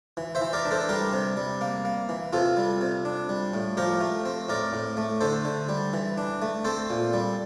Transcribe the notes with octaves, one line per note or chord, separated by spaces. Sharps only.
E3
C5 E5
E3
A#4 D5
D4
A4 C5
G3 G4 A#4
C3
G3
A#3
A#3
E3
C3 F4 A4
G3
C3
D4
G3
A2
F3 G4 A#4
A3
C4
A2 A#4 D5
A2
A3
D3 A4 C5
D3
G3
E3
D4
A3
C4 A4 C5
A#2
G3